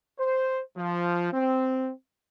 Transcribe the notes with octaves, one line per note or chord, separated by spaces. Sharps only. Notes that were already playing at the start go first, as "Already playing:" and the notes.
C5
F3
C4